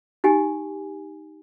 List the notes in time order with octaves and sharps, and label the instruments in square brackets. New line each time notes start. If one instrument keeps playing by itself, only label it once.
[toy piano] D#4 G4 G#5